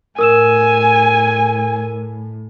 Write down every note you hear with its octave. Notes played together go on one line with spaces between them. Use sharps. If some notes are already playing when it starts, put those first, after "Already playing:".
A2 A#4 G#5 E6 E7